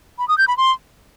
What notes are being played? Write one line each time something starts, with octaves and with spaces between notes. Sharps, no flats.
B5
D#6
G6
B5
C6